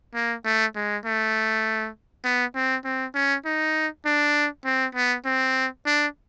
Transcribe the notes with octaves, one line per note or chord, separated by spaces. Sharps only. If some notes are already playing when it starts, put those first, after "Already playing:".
A#3
A3
G#3
A3
B3
C4
C4
C#4
D#4
D4
C4
B3
C4
D4